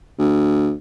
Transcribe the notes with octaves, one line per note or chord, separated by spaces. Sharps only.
D2